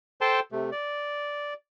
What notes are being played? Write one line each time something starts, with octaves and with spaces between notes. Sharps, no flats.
A4 C5 G5 A5 C6
C3 A3
D5